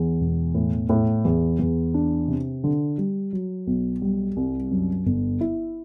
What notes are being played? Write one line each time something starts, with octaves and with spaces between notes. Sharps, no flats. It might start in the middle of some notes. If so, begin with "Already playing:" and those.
Already playing: E2
E1
A2
A2
E2
E2
D4
C3
D3
G3
F#3
B1
G3
C2
F#2
G1
E4